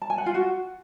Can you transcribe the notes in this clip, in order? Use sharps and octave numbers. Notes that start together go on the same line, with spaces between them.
A5
G#5
F#5
F4
F#4